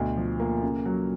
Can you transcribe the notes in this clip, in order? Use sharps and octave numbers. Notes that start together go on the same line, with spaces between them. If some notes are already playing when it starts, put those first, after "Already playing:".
Already playing: D2 B2
F3
A#3
C#3
F#3